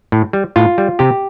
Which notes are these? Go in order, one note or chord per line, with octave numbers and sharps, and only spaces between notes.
A2
G3
A2 F4
G3
C3 G4